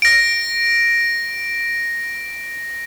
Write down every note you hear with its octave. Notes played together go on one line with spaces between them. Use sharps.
A#6 D7